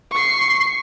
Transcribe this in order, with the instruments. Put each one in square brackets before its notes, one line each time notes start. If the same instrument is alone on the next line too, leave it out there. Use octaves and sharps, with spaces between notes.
[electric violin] C#6 C7